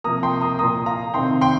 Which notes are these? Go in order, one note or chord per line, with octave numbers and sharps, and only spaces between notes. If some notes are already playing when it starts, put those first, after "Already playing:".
C3 F3 A#3 A#5 D#6
G5 C6
A#5 D#6
A#2 A#3 A#5 D#6
F5 A#5
C3 D#3 C4 G5 C6
G5 C6